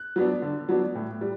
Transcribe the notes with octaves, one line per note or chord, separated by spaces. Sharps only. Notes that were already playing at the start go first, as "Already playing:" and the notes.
Already playing: F#6
F#3 B3 D4
D3
F#3 B3 D4
A2
G3